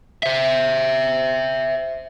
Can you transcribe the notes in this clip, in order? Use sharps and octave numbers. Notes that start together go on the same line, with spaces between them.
C5 E5